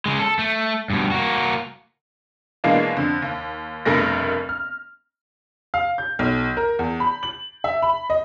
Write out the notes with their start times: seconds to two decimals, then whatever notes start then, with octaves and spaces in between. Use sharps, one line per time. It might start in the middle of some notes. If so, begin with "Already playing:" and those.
0.06 C#3 G#3
0.19 A4
0.39 A3
0.90 G2 B2
1.12 A#3 F#4
2.64 B2 E3 G#3 A#3 D4 F4
2.96 F2 D3
3.22 D#2
3.85 F1 G2 B2 A3 A#4 A#6
4.49 F6
5.74 F5
5.98 G6
6.19 B1
6.57 A#4
6.79 E2
7.00 B5
7.23 F#7
7.64 E5
7.82 B5
8.10 D#5